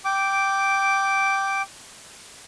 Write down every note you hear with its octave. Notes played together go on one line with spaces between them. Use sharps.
G5 D6